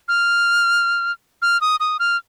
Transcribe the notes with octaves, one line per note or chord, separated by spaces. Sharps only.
F6
F6
D#6
D#6
F6